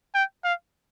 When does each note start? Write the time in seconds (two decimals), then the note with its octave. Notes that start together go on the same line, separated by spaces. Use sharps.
0.15 G5
0.44 F5